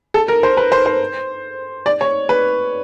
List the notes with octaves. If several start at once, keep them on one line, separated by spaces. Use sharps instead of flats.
A4
A#4
C5
B4
C5
C5
D5
C#5
B4